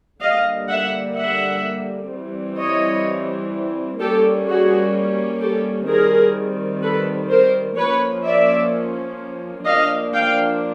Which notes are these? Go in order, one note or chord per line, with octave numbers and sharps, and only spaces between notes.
D3 G3 A#3 D#5 F5
E5 F#5
E5 F#5
E3 G3 C4
C#5 D#5
G3 A#3 C#4 G4 A4
F#4 G#4
G4 A4
D#3 G3 C4 G#4 A#4
A4 B4
A#4 C5
F3 A#3 C#4 B4 C#5
D5 E5
F3 A#3 D4 D#5 F5
F5 G5